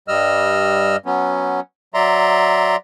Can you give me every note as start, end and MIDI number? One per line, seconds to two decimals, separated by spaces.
0.08 0.96 43
0.08 0.96 55
0.08 0.96 75
0.08 0.96 88
0.08 0.96 89
1.06 1.60 54
1.06 1.60 59
1.06 1.60 61
1.94 2.76 54
1.94 2.76 74
1.94 2.76 76
1.94 2.76 82
1.94 2.76 84